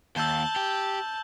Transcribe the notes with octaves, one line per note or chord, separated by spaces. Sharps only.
D#2 A5 E6 G6 G7
G4